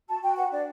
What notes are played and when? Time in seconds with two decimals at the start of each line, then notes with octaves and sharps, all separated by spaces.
0.08 F#4 A5
0.22 F#4 G5
0.37 B4 F#5
0.51 D4 D5